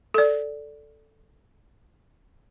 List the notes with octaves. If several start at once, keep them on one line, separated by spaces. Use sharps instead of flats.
A4 D5